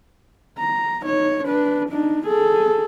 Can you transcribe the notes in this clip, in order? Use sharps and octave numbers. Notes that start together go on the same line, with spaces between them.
A#5
D#4 C#5
D4 B4
D4 D#4
G#4 A4